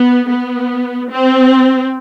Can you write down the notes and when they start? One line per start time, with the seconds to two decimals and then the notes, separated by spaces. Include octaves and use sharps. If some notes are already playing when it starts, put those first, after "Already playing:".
Already playing: B3
0.30 B3
1.11 C4